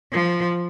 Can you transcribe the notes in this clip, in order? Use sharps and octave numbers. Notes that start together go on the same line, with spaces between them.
F3